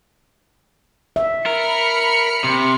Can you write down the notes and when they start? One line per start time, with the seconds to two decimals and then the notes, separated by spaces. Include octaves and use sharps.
1.16 E5
1.46 A#4 B5 F6 C#7
2.44 C3